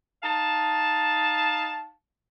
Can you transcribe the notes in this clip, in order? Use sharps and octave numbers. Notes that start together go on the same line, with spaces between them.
D#4 F5 A5